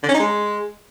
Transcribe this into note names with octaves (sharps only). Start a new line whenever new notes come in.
D3
C#4
D#4
G#3